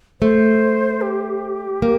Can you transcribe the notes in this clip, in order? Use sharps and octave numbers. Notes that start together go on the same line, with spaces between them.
A3 C5
G4
A#3